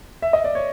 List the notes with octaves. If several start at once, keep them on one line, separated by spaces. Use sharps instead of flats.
E5
D#5
D5
C#5